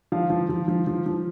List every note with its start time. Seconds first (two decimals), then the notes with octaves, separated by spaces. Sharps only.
0.12 F3 F5
0.30 F3
0.49 F3
0.68 F3
0.87 F3
1.06 F3